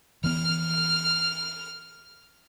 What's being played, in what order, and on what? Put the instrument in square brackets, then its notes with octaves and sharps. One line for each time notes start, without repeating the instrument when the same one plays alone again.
[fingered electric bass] E3 B3 [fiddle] F6